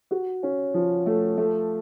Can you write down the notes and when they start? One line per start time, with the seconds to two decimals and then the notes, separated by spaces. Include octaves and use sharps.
0.11 F#4
0.43 C#4
0.74 F3
1.06 A3
1.37 A3